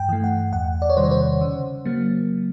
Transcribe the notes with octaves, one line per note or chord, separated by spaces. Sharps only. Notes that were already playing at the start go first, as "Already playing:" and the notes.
Already playing: G2 G5
E3 A3
F#5
E2 F#5
D5
C#5
C3 D#3 G3 C5
C#5
C5
C#3
F#3 A#3